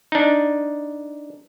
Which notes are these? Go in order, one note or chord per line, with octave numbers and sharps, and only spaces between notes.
D4 D#4